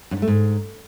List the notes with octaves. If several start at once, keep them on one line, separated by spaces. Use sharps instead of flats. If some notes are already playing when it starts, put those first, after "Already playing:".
F#2
G#2
A3
G#2